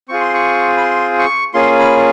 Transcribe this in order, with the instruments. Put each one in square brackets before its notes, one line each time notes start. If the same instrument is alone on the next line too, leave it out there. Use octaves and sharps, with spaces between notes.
[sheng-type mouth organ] C4 F4 G#4 C#6
C6
C#6
B5
C6
C#6
A#3 C#4 F4 G#4 C6
B5